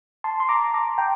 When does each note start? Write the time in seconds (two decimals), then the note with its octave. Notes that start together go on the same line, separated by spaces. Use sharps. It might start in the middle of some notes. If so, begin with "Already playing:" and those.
0.24 A5 C6
0.40 C6
0.49 A#5 D6
0.74 A#5 D6
0.98 G5 A#5